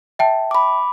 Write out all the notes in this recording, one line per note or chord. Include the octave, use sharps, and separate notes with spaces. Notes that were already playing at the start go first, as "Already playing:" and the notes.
E5 G5 A5
B5 D6